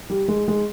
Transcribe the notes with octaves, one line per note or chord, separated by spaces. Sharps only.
G3
G#3
G#3